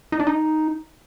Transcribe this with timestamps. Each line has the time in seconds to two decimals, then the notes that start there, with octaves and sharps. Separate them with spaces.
0.12 D#4
0.20 D4
0.27 D#4